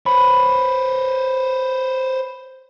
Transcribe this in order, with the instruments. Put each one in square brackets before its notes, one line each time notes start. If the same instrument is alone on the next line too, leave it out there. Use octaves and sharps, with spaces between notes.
[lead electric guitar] C5 C#5 [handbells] B5